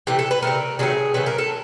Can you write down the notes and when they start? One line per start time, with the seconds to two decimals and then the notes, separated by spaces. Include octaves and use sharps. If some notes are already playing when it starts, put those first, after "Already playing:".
0.07 C3 E3 A3 G4
0.19 A4
0.31 B4
0.42 E3 A3 A#4
0.47 C3
0.79 C3 D#3 F#3 A3 G#4
1.14 C3 D#3 F#3 A3 B4
1.26 A#4
1.38 A4